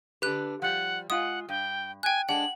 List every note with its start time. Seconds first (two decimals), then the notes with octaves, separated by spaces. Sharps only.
0.22 D3 D4 G4 B4 F#6
0.62 F3 G3 F#5
1.10 G#3 F4 F#5 G#5 D#6
1.49 G2 G5
2.03 G5 G#5 F#6
2.29 G#3 D4 F#5 F#7